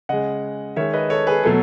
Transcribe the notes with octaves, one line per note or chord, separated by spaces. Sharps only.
C#3 G#3 D#5 F#5
D#3 G#3 C#5 E5
B4 D#5
A4 C#5
G#4 B4
B2 F#3 A3 A4